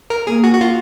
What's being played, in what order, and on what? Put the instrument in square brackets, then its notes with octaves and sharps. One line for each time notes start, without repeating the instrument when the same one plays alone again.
[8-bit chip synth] A#4
[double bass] A#3 [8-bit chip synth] G#4
[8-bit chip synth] F#4
F#4
F4